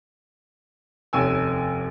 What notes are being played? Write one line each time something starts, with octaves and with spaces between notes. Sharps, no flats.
F1 D#2 C#4 G#5 C#6 E6